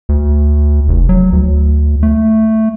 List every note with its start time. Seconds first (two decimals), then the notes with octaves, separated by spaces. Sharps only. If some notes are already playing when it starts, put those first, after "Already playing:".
0.09 D2
0.88 F1
1.09 F#3
1.33 D2
2.03 A3